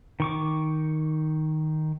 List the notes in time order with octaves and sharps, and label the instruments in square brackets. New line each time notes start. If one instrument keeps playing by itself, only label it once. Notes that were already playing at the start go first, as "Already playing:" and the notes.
[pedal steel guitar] D#3 C#6 D6